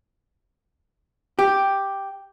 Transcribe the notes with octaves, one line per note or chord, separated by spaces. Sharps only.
G4